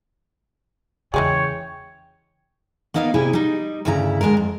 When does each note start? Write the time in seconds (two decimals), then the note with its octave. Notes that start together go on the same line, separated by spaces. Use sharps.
1.14 E2 C#3 E3 G#3 G#4 C#5 G5
2.94 A#3 B3 D#4 A#4 D#5 F5
3.14 C3 G3 E4 G#4 G#5
3.33 G3 D#4
3.85 D2 G2 C#3 E4 G#5 A#5
4.21 D2 G2 G#3 D4 A#4
4.37 F2